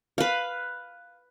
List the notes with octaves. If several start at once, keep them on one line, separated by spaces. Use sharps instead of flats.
B4 F5